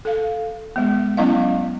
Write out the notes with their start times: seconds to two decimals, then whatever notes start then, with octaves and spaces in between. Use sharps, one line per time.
0.05 A4 F5
0.76 G#3 B3
1.17 F#3 B3 C#4 E4 D#5 F5